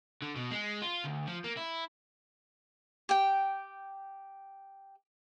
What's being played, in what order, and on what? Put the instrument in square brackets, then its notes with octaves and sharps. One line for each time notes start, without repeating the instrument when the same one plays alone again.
[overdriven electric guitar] D3
B2
G#3
F4
D2
F3
A#3
E4
[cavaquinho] G4 G5